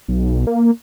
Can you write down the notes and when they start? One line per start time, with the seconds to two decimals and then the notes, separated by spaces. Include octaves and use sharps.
0.08 B1
0.47 A#3